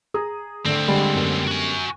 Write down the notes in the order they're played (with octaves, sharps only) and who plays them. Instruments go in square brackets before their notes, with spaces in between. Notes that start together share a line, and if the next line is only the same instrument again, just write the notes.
[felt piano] G#4 A#5 D#6
[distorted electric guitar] D2 C4 [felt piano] D3 A3
[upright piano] D3 G3 G#3 [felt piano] B5
[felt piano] F#2 B3 G5
[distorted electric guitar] F#4 G#5